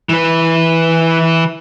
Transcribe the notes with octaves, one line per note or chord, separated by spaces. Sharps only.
E3 B4